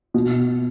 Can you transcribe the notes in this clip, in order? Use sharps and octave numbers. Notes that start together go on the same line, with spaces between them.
B2